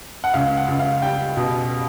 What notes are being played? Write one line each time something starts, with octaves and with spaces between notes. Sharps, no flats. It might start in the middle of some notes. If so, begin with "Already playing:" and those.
F#5
C#2 F5
F#5
C#2
F5
G3 G5
B2